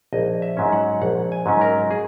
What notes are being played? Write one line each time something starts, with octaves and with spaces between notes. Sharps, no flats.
A#1 D#5
E5
G#2 F#3 C#4
F#5
A#1 F#5
G#5
G#2 F#3 C#4
A#4
G#4